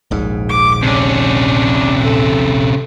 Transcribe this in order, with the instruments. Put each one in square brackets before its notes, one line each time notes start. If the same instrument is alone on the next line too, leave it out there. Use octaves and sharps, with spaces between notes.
[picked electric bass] D#1 A#1 G#2
[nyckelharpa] D6
[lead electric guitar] C3 C#4 [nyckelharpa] D4
[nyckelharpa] A4